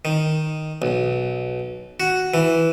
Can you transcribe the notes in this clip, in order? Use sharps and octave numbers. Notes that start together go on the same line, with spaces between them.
D#3
B1
F#4
E3